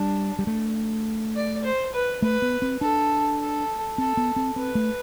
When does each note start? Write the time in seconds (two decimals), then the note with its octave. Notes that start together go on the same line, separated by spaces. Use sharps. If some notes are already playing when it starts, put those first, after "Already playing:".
Already playing: G3 D4
0.39 G3
0.47 A3
1.36 D5
1.64 C5
1.94 B4
2.22 A3 B4
2.42 B3
2.62 C4
2.81 D4 A4
3.39 A4
3.97 C4 A4
4.17 B3
4.36 C4
4.56 C4 B4
4.75 A3